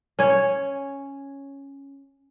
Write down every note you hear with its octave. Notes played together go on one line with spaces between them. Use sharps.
C#4 C#5